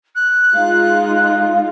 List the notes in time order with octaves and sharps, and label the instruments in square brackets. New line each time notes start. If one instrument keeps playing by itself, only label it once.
[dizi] F#6
[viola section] G#3 D#4 F4 [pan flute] F5